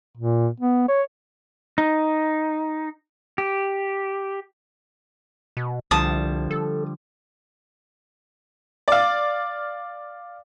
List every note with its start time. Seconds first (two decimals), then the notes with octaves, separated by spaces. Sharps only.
0.17 A#2
0.60 B3
0.88 C#5
1.78 D#4
3.38 G4
5.57 B2
5.91 C2 D3 F3 G3 A5 D#6
6.51 A4
8.88 D5 F5